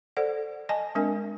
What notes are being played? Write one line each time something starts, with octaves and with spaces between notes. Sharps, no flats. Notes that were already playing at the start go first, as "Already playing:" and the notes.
A4 C5 D5 F#5
D#5 G#5 A5
G#3 C4 D4 A#4 G#5